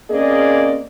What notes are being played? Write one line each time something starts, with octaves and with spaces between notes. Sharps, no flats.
A#3 C4 C#4 G#4 D5 D#5